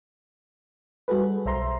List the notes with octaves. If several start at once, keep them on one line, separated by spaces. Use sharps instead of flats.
G3 F#4 G#4 A4 B4
B1 C5 E5 A#5 C6